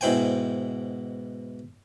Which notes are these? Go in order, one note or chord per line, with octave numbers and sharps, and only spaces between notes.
G#2 B2 E4 C5 G5 G#5